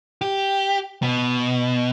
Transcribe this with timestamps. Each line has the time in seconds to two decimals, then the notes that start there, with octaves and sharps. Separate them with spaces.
0.21 G4
1.02 B2